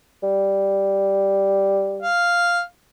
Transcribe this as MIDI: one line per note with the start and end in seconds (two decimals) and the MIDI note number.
0.23 2.08 55
2.02 2.61 77